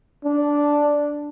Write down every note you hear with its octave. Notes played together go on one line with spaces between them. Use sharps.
D4